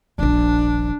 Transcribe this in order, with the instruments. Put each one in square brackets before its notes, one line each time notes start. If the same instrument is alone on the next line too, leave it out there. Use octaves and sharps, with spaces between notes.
[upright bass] D#1 A#1 [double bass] D4